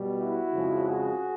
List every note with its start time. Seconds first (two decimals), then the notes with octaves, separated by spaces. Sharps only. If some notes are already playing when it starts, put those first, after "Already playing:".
Already playing: B2 G3
0.18 E4 F#4
0.54 F2 C#3 F3 G#3
0.89 F#4 G#4